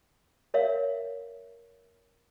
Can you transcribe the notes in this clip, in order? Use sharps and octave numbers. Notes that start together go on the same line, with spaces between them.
A#4 C#5 E5 F5